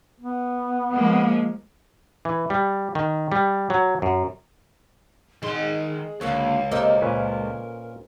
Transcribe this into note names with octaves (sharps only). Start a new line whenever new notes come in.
B3
F3 G#3 A#3
E3
G3
D#3
G3
F#3
F#2
D#3 G#3 G#4 C6
C#2 D3 A#3 F#4 C#5 F5
C3 A#3 A4 A#4 C5 D#5
A#2 C#4 B4